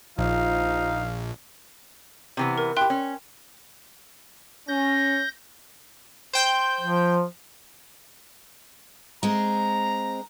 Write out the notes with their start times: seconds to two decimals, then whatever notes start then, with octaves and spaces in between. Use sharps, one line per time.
0.18 A#1 F3 D#4 F5
2.37 C3 E3 B3
2.58 A#4
2.77 E4 G4 G5 C6 F#6
2.90 C#4
4.68 C#4 G6 A#6
6.33 C5 G5 G6
6.81 F3
9.23 G#3 C4 A#5